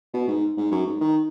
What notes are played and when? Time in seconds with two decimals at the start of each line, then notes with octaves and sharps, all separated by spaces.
0.14 B2
0.28 G#2
0.57 G#2
0.71 F#2
0.86 G#2
1.01 D#3